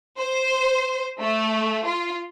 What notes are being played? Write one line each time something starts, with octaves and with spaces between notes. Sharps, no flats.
C5
A3
F4